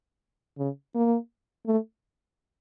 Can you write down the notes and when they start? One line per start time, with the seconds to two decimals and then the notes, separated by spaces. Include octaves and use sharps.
0.58 C#3
0.95 A#3
1.67 A3